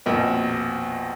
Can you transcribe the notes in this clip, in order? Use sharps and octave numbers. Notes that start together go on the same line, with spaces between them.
A#1 F2 B2